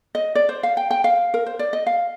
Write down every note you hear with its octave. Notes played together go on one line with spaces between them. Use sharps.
D#5
D5
C5
F5
G5
G5
F5
A#4
C5
D5
D#5
F5